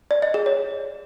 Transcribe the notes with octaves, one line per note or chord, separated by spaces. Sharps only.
D5
D#5
G#4
C#5